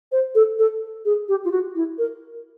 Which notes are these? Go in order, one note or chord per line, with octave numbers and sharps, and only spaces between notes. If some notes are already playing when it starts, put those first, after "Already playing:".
C5
A4
A4
G#4
G4
F4
F#4
E4
A#4